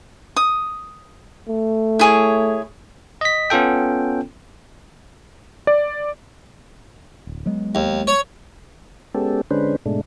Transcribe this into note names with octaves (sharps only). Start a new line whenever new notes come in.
D#6
A3
E4 G#4 C#5
D#5 B6
B3 C#4 F4 A4 G5
D5
D1
F#3 G#3 B3
D#2
C#5
G#3 B3 C#4 G4 A4
D3 G#3 C#4 D4 B4 C5
G#2 B2 G#3 A3 D4